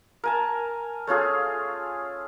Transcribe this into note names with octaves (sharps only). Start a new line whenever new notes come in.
A#4 G#5 A5
A3 C#4 F4 G#4